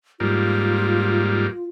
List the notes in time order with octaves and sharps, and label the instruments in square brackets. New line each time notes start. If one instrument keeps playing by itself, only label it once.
[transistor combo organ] G#2 G3 A#3 [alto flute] F4